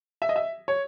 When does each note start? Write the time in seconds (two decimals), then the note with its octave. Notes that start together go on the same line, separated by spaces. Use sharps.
0.22 E5
0.29 D#5
0.36 E5
0.68 C#5